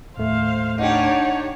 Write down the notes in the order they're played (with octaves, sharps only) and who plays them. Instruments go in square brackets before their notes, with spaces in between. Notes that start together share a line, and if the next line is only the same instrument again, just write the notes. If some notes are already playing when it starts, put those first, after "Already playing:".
[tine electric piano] D#2 A2 A3 [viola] C5 F5
[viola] D4 C#5 [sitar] D#4 G4 [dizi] F#5